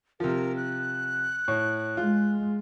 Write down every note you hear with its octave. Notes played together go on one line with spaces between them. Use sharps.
C3 F3 A#4
F#6
A2
G#3 F4